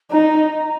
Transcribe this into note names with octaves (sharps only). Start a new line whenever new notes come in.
D#4 A#5